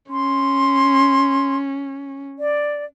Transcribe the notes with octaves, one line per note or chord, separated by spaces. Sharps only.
C#4 C6
D5